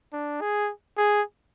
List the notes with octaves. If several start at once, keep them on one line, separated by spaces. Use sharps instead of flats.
D4
G#4
G#4